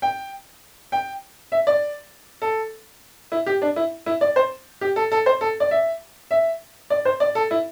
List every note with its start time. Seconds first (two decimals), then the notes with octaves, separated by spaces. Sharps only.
0.02 G5
0.92 G5
1.52 E5
1.67 D5
2.42 A4
3.32 E4
3.46 G4
3.62 D4
3.76 E4
4.06 E4
4.21 D5
4.36 C5
4.81 G4
4.96 A4
5.12 A4
5.26 C5
5.41 A4
5.60 D5
5.71 E5
6.31 E5
6.90 D5
7.05 C5
7.20 D5
7.35 A4
7.51 E4